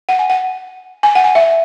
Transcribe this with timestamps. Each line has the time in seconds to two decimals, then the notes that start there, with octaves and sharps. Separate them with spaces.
0.09 F#5
0.19 G#5
0.30 F#5
1.03 G#5
1.15 F#5
1.24 G#5
1.35 E5